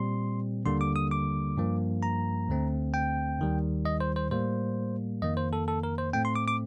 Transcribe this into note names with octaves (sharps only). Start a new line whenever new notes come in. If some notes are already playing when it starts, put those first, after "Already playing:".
Already playing: A#2 G3 C4 C6
D#2 D3 G3 A#3 C6
D6
D#6
D6
G2 F3 A#3
A#5
D2 D3 A3 C4
G5
D#2 D#3 G3
D#5
C5
C5
A2 G3 A#3 C5
F2 D#3 A#3 D#5
C5
A4
A4
A#4
C5
A2 A3 C4 G5
C6
D6
D6